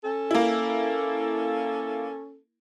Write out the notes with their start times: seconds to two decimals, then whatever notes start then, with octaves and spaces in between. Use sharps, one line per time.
0.04 C#4 A4
0.31 A#3 E4